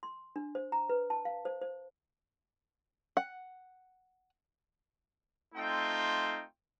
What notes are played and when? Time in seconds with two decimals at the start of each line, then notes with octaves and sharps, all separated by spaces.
0.03 C6
0.36 D4
0.55 C5
0.72 A#5
0.89 B4
1.10 A5
1.25 F5
1.45 C5
1.62 C5
3.17 F#5
5.55 A3 C4 D#4 F4 G5